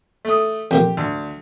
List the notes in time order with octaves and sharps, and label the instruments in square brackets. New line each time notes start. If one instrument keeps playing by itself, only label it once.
[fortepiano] A3 D#6
[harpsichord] F2 A#2 A#3 [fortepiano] G4
[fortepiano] D2